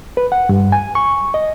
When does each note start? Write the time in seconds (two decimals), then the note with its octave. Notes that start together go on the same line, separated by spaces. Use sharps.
0.17 B4
0.32 F#5
0.49 G2
0.72 G#5
0.95 C#6
1.34 D#5